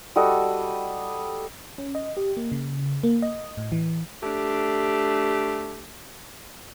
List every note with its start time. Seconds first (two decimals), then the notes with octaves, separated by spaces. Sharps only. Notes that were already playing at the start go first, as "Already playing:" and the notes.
0.16 G3 F#4 A4 D#5
1.78 C#4
1.95 D#5
2.17 G4
2.37 A#3
2.52 C#3
3.03 A#3
3.22 D#5
3.57 A2
3.72 E3
4.23 A3 D4 G4